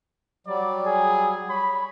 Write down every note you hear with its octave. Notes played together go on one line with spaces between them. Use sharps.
F#3 G3 D5
G#4
C#5 B5